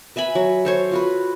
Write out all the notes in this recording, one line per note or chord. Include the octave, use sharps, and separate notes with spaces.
B4 E5 G#5 B5
F#3
A4 C5 C#5
F4 F#4 B4